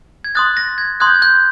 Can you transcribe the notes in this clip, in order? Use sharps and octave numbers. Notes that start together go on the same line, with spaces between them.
G#6
C6 D#6 F#6 A6
A#6
G#6
C6 D#6 F#6 G#6
G6
G#6
G6